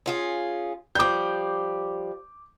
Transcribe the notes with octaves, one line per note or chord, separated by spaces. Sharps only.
C#4 F4 G#4
F3 G3 D6 G6